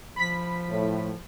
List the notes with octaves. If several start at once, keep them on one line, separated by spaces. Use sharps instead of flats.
F3 B5 B6
A2